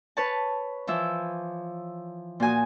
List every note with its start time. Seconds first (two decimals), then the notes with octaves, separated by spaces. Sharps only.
0.17 B4 C#5 A5
0.87 E3 F3 E4 E5
2.40 A#2 F#4 G#5 D#6